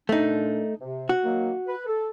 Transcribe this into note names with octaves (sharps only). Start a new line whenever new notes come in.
A#2 A3 D4 D#4
C3
F#4
D#3 F#3 A#3
B4
A4